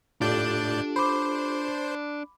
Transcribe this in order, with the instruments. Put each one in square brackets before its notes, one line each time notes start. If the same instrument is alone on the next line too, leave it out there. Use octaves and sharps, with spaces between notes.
[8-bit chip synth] A2 D5 G6 [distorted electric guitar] D4 [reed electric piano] F4 G4 A4
[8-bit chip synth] C5 [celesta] B5 D6